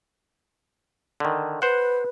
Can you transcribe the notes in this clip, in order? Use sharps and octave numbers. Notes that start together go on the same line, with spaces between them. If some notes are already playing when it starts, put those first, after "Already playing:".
D3 D#3
B4 C5 F#5